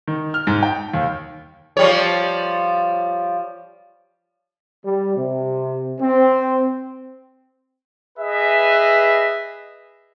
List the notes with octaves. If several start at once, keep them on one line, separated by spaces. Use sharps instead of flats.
D#3
F6
G#2
G5
D#2
F3 G3 C#5
G3
C3
C4
G#4 B4 D#5 E5